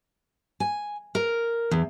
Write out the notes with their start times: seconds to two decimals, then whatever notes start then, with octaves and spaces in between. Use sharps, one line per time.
0.60 G#5
1.15 A#4
1.71 E2